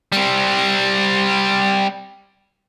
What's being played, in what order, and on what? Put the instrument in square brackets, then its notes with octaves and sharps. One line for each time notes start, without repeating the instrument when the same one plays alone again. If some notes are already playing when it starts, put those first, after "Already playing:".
[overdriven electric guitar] G3 C4